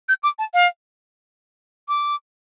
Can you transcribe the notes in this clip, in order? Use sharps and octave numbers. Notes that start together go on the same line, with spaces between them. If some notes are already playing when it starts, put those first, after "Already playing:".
G6
D6
A5
F5
D6